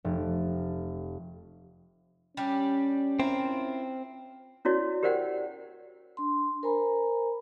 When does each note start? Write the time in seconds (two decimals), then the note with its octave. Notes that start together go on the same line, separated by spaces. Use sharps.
0.05 F1
2.37 G3 C#4 D4 G4
3.20 C4 E4 F4 A#4
4.65 C#4 E4 F#4 C#5 D5
5.03 G4 A#4 C5 D5 F#5 G5
6.17 D4 C6
6.63 A#4 C5 G#5 A#5 B5